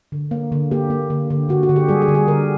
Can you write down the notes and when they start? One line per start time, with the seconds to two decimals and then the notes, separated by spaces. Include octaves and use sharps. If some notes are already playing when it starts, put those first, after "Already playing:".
0.12 D3
0.31 A#3
0.52 D3
0.71 A#3 G4
0.90 A#3
1.10 D3
1.30 D3
1.49 D3 F#4
1.63 F#4
1.69 D3
1.76 G4
1.88 G3 G#4
2.02 G#4
2.08 D3
2.15 G#4
2.28 D3 A#4